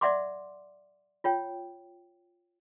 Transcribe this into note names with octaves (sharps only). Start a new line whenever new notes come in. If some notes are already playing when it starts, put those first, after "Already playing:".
D5 E5 F#5 C6 D6
F4 C#5 G5